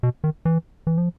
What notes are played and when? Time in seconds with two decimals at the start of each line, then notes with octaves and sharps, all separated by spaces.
0.03 B2
0.24 D#3
0.45 E3
0.87 E3
0.98 F3